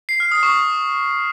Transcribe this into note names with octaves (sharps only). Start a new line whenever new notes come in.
C7
F6
D#6
C#6